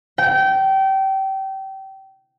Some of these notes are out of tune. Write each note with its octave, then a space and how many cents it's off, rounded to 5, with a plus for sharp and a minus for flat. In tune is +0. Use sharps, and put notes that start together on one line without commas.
G5 -25